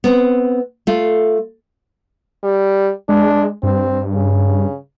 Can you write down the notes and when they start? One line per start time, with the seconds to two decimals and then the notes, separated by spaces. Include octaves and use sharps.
0.04 B3 C4
0.87 A3 F4
2.43 G3
3.09 G#3 D4
3.63 G2 C4
4.14 C#3